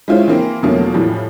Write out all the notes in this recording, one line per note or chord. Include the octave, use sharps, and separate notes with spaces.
G#3 C#4 E4 F4 C5 C#5
E3 A#3 C4
E2 B2 F3 F#3 A3 A#3
A2 E3 F3 G3